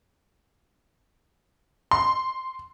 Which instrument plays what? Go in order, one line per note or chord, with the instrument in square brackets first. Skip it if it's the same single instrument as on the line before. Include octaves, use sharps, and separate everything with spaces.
[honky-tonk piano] C6